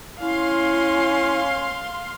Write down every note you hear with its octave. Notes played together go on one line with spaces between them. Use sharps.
C#4 E4 F5 C6